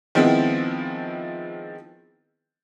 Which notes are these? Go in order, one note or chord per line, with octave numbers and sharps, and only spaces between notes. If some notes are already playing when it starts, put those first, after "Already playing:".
D#3 F3 G#3 B3 C4 E4